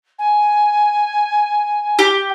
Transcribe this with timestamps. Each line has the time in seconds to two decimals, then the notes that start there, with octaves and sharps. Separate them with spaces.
0.18 G#5
1.99 G4